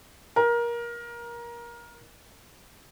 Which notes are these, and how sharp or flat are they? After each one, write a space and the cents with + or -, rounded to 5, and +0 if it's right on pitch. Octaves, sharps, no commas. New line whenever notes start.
A#4 +20